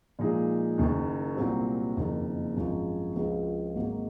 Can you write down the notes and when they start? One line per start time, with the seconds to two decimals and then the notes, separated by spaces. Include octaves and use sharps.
0.19 A#2 F3 G#3 D#4 G#4
0.78 F#1 F#2 D#3
1.37 C2 A#2 F#3 C4
1.96 F#1 F2 D#3 A#3
2.55 G#1 F#2 F3 G#3
3.15 C#2 C#3 F3 C4 F#4
3.74 G#1 G#2 F#3 A#3